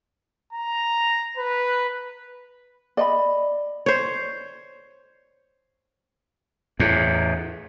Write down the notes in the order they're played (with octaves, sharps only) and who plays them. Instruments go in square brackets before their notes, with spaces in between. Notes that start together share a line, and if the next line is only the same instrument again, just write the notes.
[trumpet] A#5
B4
[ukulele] D5 D#5 B5
[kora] C5 C#5
[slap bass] E2 A2